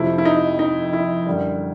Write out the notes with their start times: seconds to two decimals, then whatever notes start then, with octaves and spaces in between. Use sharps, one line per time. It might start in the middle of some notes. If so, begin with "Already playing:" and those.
Already playing: F2 C3 F3 A3 E4
0.18 E4
0.25 D#4
0.59 D#4
0.93 E4
1.27 F#2 D3 G3